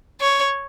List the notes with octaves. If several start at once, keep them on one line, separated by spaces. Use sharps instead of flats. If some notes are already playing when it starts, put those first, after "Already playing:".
C#5